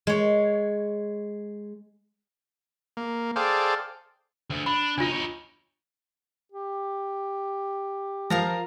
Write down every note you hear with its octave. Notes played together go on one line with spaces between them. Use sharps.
G#3 C#5
A#3
G#4 A4 C5 D5 F5 G5
D2
D4 B5
C#2 D4 D#4 F4
D#4 C#5
G4
F3 A#4 F5 A#5